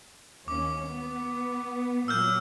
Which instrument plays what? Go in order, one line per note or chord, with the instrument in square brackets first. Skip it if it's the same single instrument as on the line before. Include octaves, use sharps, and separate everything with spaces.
[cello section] D#2 C#4 [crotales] D6
[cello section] B3
[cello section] A#2 F#3 [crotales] E6 F6 G6